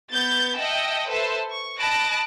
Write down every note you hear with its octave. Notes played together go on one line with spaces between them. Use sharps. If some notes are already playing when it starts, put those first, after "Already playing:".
B3 G6 A6
D#5 E5 F#5 G5 A5
A4 B4 C5 E5 A5
C#6
D#5 A5 B5 F#6 A#6 D7